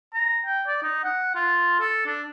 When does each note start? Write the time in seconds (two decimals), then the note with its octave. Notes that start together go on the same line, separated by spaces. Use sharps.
0.14 A#5
0.46 G5
0.67 D5
0.83 D#4
1.04 F#5
1.35 F4
1.80 A4
2.06 D4